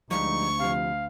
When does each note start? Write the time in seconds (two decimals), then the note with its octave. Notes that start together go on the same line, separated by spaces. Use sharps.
0.11 D2 F3 G3 G#3 D#4 C#6
0.60 C3 F3 F5